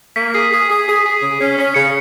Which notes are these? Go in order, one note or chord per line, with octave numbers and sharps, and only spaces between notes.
A#3 B6
G#4
G#4
G#4
G#4
G#4
C#3
C#4
C#4
C#3 C#7